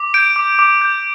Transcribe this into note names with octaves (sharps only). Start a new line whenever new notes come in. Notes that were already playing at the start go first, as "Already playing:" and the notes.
Already playing: D6
G6 D7
D6
D6
G6